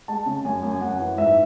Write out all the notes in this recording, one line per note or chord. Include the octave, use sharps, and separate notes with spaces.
G#3 A5
C#3
F#2 G#5
F#2
G#5
F#2 F#5
E3
G#2 E5